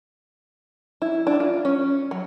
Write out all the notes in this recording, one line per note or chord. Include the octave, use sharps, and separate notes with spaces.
E4
D4
F4
C#4
F#3